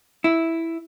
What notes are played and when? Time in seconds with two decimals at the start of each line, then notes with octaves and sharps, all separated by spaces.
0.24 E4